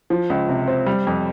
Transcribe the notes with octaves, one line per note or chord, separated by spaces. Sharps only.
F3
C#2
C3
C4
G3
F2